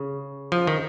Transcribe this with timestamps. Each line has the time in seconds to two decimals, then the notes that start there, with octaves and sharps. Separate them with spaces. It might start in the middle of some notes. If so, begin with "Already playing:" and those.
Already playing: C#3
0.52 F3
0.67 D#3